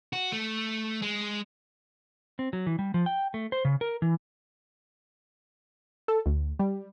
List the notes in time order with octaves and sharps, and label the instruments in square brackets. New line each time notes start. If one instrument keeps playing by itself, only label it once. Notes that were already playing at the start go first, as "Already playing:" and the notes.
[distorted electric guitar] F#4
A3
G#3
[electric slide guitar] C4
F#3
E3
G3
F3
G5
A3
C5
C#3
A#4
E3
[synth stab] A4
D2
G3